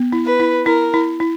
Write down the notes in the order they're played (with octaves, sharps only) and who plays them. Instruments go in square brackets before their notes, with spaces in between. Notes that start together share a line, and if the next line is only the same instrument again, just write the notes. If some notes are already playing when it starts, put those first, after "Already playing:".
Already playing: [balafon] B3
E4
[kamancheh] B4
[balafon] E4
[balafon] E4 [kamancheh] A#4
[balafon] E4
E4